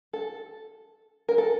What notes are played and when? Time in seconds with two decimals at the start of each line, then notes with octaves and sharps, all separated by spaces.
0.13 A4
1.29 A#4
1.38 A4